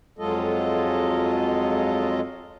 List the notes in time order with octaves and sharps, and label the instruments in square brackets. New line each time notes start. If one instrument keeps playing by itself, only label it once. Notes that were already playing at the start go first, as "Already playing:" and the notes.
[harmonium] F2 F#3 G#3 F4 A4 D#5